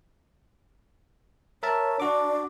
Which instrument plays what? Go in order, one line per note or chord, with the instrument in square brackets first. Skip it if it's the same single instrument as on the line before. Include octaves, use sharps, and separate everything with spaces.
[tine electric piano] A#4 E5 A5 [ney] C#5
[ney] D4 [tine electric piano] F#4 D6